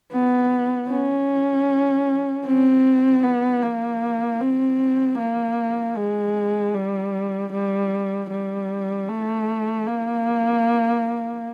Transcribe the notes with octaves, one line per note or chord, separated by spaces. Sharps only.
B3
C#4
C4
B3
A#3
C4
A#3
G#3
G3
G3
G3
A3
A#3